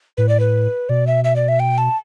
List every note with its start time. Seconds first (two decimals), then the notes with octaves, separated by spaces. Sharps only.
0.17 A2 B4
0.29 D5
0.40 B4
0.89 B2 D5
1.07 E5
1.24 E5
1.36 D5
1.48 E5
1.60 G5
1.78 A5